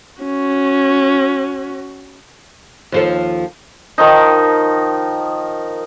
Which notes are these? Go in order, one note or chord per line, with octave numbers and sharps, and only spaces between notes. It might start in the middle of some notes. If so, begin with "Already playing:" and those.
C#4 F#4
D#2 F3 A4
D#3 F3 D#4